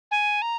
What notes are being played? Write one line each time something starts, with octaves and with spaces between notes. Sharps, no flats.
G#5
A#5